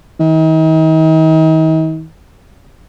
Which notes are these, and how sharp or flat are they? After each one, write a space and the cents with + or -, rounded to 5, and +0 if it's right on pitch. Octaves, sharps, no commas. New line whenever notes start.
D#3 +40